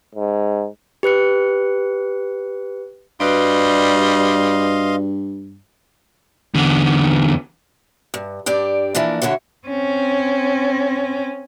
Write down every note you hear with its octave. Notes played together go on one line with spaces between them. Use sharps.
G#2
G4 B4 F#6 C#7
G2 G3 F#4 B4 D5 D#5 F5 C6
E2 D3
G2
G2 D4 G4 D5
E3 F3 A#3 D4
D3 E3 F#4 C#5
C4 C#4